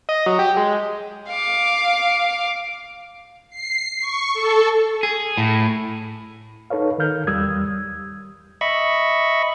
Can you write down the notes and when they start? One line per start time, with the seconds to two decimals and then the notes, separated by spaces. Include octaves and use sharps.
0.09 D#5
0.26 F#3
0.39 G4
0.57 G#3
1.29 F5 D6
3.50 C7
4.00 C#6
4.34 A4
5.03 G#4
5.38 A2
6.70 D#4 A4 B4 C#5 F5
6.98 D#3 A#4 F5 F6 G6
7.27 E2 G3 D#6 E6 G#6
8.61 D#5 E5 B5 C#6